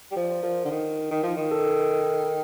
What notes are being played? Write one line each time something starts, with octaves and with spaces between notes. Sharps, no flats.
G3
F3 C5
D5
C5
F3 A#4
D3
D#3
D#3
F3
D#3
A4